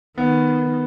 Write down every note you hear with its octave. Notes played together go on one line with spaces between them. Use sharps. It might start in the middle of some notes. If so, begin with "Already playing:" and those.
D#3 B3